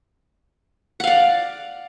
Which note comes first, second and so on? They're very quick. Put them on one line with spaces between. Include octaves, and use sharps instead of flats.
F#5 F5 D5